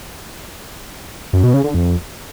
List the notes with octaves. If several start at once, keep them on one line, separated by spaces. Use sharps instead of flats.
F#2
B2
C#3
D3
F2